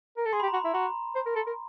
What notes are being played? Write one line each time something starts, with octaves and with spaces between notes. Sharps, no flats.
A#4
A4
G#4 C6
B5
G4
A#5
F#4 B5
E4
F#4 A#5
C5
A#4
A4
A#4